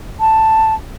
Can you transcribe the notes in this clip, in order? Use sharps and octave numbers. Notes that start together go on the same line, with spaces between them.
A5